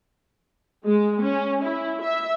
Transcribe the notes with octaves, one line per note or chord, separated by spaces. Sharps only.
G#3
C#4
E4
E5